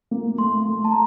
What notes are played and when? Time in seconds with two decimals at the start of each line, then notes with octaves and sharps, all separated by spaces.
0.11 A#3
0.38 A3 C6
0.65 A3
0.84 A5
0.92 A#5